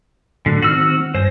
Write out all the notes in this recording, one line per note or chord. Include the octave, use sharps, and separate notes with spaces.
A2 D3 F#3 F#5
D#3 C4 F#4 E6 F6
G2 C5 G#5 A#6